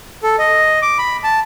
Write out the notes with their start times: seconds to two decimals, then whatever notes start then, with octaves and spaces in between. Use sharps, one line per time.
0.23 A4
0.39 D#5
0.82 D6
0.98 B5
1.24 A5